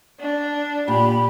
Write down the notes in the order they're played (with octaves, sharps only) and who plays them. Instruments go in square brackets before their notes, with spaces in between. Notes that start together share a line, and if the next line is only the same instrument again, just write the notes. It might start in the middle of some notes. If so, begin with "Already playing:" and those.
[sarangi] D4
[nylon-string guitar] A#2 [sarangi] G4 [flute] B5